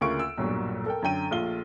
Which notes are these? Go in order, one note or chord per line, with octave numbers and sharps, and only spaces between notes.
D2 C#3 A#3 F4 C#6 D7
E6
B1 G2 A#2 F#3
A4 A#4 G5
F#2 D3 G5 D#7
A#1 A3 F4 G7